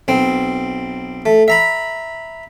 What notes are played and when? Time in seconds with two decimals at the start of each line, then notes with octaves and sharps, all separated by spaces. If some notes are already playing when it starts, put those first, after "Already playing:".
0.08 B1 C4
1.26 A3
1.48 E5 A#5 B5